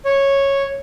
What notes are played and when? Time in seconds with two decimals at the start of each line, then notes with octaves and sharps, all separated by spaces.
0.05 C#5